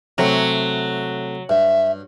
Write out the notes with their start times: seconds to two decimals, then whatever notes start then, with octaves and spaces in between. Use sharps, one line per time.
0.18 C3 F#3 A3 C4
1.49 G2 E5